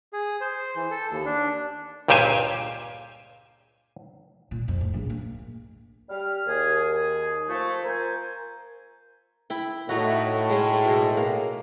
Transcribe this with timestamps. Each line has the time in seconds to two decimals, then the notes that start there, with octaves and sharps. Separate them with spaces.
0.13 G#4
0.41 C5
0.76 E3
0.91 A4
1.11 D#2
1.25 D4
2.08 C#2 G2 A#2 G4 C5 G#5
4.51 A#2
4.68 F2
4.81 A2
4.94 A#1
5.10 A#3
6.09 G3 F6
6.47 D#2 G#4
7.49 F3 A3
7.84 A#4 C5 G#5
9.50 E4 G5
9.89 A2 A3 D#4 F#4
10.50 G#3 C#4
10.85 B2 G#3
11.17 A#3